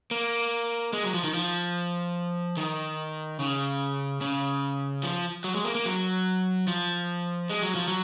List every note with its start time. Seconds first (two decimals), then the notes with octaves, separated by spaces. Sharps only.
0.11 A#3
0.93 G#3
1.03 F#3
1.14 F3
1.24 D#3
1.34 F3
2.57 D#3
3.39 C#3
4.21 C#3
5.03 F3
5.44 F#3
5.55 G#3
5.65 A#3
5.75 A#3
5.85 F#3
6.67 F3
7.49 G#3
7.62 F#3
7.75 F3
7.88 F#3